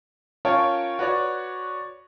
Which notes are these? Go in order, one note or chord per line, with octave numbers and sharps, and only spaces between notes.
C#4 F4 A#4 C#5 G5 A5
F#4 B4 C#5 D5